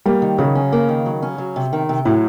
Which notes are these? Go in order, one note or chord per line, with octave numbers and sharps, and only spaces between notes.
G3 A#3
D#3
C#3 F#3
C#4
A#3
D#3
F#3
C#4
F#3
C3
D#3
C3
A2 F#3